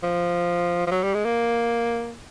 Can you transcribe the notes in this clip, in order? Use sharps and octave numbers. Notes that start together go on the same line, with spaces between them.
F3
F3
F#3
G3
G#3
A#3